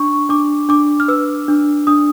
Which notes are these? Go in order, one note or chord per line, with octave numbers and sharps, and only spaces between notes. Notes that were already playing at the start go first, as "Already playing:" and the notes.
Already playing: D4 C#6
D4 D6
D4 D6
F6
B4 E6
D4
D4 D#6